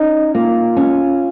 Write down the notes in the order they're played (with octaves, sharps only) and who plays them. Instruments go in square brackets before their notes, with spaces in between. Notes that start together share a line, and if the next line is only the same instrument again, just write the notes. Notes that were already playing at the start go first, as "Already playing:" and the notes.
Already playing: [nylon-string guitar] C#4 [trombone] D#4
[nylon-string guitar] A#3 [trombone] F4
[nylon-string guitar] C#4